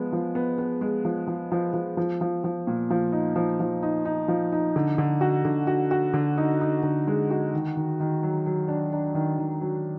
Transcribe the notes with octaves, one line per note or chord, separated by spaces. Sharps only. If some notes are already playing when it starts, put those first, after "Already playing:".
Already playing: F3 G#3 B3
F3
B3
B3
G#3
F3
F3
F3
F3
F3
F3
F3
A#2
F3
D#4
F3
F3
D#4
D#4
F3
D#4
D3
D3
F#4
D3
F#4
F#4
D3
D#4
D#4
D3
G#3
F#4
D#3
D#3
D#3
F#3
F#3
D4
D4
D#3
D#3
F#3